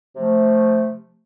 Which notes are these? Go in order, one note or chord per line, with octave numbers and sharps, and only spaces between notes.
C3 F3 A3